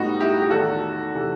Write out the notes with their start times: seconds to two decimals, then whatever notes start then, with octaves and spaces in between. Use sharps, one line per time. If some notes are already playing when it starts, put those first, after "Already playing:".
Already playing: A2 G3 B3 D#4 F#4
0.20 E4 G4
0.42 G4
0.50 E2 D#3 A3 F#4 A4
1.14 C3 E3 A3